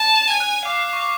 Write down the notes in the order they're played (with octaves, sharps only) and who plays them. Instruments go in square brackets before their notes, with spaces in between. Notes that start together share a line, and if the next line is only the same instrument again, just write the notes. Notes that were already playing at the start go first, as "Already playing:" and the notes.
Already playing: [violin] A5
[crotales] F7
[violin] G#5 [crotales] G#6
[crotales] F#6
[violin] F5 [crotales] D6
[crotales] C#6
D6